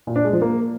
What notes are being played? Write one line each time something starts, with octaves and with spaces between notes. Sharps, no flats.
A#2
D4
G#3
F3
A#3